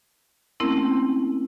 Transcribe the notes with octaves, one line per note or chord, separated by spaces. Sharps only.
A3 A#3 C4 C#4 E4 A#4